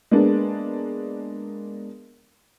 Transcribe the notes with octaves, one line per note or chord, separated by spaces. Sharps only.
G#3 A#3 B3 D4